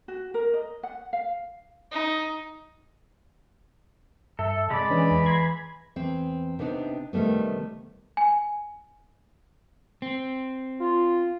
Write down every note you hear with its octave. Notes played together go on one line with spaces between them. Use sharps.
F#4
A#4
D#5
F#5
F5
D#4
G2 A4 E5
C3 G#3 D5 B5
E3 C#4 D4
E2
A#5 C6 G#6
E2 C4
C3 B3 C4 D4 D#4
C3 D#3 G3 A3 B3
G#5
C4
F4